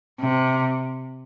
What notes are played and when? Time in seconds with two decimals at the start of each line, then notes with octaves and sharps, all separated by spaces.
0.20 C3